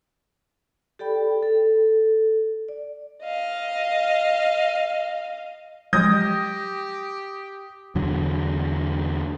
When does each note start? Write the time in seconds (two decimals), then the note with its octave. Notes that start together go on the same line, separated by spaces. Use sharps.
0.99 G4 A4 D5 G5 B5
1.43 A4
2.68 D5
3.23 D#5 F5
5.93 F3 F#3 G#3 G4 D#6 G6 A#6
7.95 E2 D3 F#3